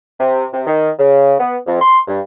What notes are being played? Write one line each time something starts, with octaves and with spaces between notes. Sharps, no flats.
C3
C3
D#3
C#3
B3
F2
C6
G2